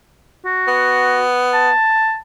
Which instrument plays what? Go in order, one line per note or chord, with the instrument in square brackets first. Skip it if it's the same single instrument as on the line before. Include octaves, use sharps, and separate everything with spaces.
[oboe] F#4
[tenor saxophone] B3
[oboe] A5